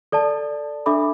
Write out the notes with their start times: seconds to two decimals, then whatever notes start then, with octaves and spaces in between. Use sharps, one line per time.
0.12 A4 D5 A5
0.86 D4 A4 E5 B5 D6